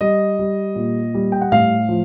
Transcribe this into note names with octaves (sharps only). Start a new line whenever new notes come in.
G3 D#5
G3
A#2
G3
G5
F#5
A2 F5
F3